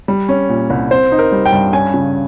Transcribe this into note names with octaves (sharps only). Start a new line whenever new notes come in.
G3
C#4
A#2
C2
C4 C5
D#4
A#4
G3
G5
G2
C#4 G#5
C#3